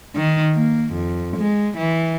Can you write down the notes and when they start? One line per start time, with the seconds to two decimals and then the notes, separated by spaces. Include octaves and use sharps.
0.16 D#3
0.55 A#3
0.93 F2
1.37 G#3
1.78 E3